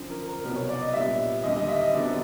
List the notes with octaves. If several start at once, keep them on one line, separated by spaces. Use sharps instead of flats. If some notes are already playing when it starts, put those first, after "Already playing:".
Already playing: F#2 D3 F3
A#4
A#4
C2 B2 F#3 B3 A#4
C#5
D5
D#5
A#1 A#2 G3 B3 E5
D#2 D3 G3 D#5
D#5
E5
D#5
F2 D3 F#3 B3 D5